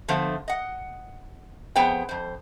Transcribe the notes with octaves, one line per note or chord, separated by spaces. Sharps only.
D3 F3 A3 B3 C5
D#5 F#5
F2 B3 G#4 C5 G5
F2 C5